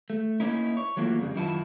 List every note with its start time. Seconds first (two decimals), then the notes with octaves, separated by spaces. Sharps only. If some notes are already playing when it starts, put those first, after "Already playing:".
0.10 A3
0.40 A#3 C#4 D#4 E4
0.77 C#5
0.97 E3 F#3 A3 A#3 F4
1.19 F2 C#3 G3
1.35 F#2 D#3 E4 F4 A5